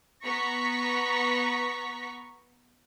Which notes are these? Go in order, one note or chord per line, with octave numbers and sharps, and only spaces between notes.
B3 A#5 C#6 B6